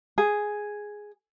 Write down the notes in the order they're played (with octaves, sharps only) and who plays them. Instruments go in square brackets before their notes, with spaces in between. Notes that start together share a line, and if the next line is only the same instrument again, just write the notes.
[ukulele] G#4